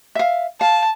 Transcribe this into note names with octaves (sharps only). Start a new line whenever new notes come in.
E5 F5
F5 A5